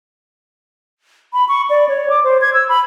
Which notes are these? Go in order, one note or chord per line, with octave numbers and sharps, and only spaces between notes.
B5
C#6
D5
C#5
D6
C5
G#6
E6
B5